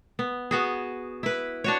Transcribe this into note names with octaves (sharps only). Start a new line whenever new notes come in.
B3
B3 F#4 G#4
E4 B4
D4 F#4 C#5